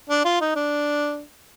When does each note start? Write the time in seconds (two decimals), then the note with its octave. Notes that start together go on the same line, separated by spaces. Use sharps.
0.10 D4
0.25 F4
0.41 D#4
0.56 D4